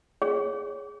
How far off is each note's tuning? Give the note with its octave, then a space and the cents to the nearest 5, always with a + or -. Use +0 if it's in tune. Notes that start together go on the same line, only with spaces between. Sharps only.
G#4 +0 C#5 +0